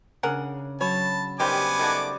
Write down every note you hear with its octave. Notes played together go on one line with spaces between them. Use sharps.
C#3 D4 G#4 A#4 F#5
F#3 C#5 A5 B5
C3 D#3 G3 B3 G4 C5 G#5 D6
D#3 A3 F#4 D5 D#5 A5 B5